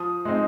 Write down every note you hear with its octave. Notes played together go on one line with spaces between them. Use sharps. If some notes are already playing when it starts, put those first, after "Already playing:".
Already playing: F3 D#6
G#3 C4 D#4